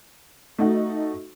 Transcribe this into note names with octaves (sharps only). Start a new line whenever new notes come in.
A3 D#4 F#4